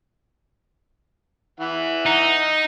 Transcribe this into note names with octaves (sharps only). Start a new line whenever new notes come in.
E3 E5 F#5
D#4